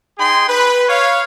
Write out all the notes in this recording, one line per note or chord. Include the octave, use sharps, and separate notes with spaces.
D#4 G#4 G5 C6
B4
C#5 F5